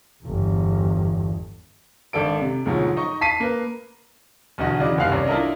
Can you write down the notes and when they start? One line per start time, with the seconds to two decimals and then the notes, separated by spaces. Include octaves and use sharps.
0.23 G1 E2
2.13 G#1 D4 A4 D7
2.41 C3
2.65 D2 G#2 B2 F3 F#3
2.97 D#4 D#5 C#6
3.21 A5 B6 C7 D#7
3.40 A#3 B4
4.58 B1 E2 D3 D#4 F#4
4.80 C#3 E3 F#4 D5 D#5
4.98 F#1 C3 D#3 F5 F#6 C7
5.12 C2 C#4 D5
5.28 D4 E4 F4 A4 A#4 D#5